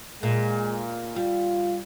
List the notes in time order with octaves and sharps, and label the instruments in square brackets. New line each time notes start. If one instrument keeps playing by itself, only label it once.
[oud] A#2 [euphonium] G#3
[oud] G3 [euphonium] F4